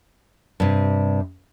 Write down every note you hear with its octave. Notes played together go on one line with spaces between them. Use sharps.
G2 C3